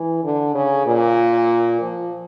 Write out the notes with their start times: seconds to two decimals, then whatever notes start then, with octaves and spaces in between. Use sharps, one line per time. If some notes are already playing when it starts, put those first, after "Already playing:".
Already playing: E3
0.24 D3
0.54 C#3
0.86 A#2
1.82 F3